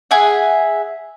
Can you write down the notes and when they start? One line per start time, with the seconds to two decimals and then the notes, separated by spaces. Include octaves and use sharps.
0.11 G#4 E5 F#5